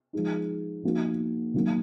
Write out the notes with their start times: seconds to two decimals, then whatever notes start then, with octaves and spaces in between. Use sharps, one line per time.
0.13 F3 G#3 D#4
0.83 F3 A#3 D#4 F#4
1.54 D#3 F#3 A#3